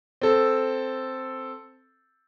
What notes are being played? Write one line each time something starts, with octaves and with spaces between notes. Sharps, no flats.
C4 A4